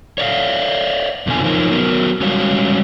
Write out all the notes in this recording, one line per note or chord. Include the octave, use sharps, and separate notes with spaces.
C#5 D5 F5
F2 B2 D3 F3 G#5
F3 D#4 F4 A#4 C#5
F#3 B3 A#4
G3 G#3 C#4 F#4 C#5 F5